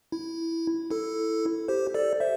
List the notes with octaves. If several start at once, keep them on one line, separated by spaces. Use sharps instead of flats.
E4
E4 A4
G4 C5
A4 D5
C5 E5